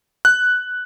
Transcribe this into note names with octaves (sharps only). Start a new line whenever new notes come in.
F#6